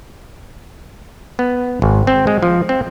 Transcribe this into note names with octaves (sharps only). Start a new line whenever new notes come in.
B3
G#1
C4
G#3
F3
C4